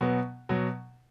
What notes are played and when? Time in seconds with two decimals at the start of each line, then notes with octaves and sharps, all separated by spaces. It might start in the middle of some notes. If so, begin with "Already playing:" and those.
0.01 B2 F#3 B3
0.49 B2 F#3